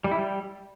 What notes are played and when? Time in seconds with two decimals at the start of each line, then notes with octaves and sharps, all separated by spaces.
0.04 G3
0.12 E4
0.19 G3